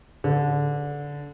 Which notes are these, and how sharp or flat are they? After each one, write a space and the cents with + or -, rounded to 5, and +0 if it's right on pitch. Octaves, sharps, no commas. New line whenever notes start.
D3 -20 B4 +0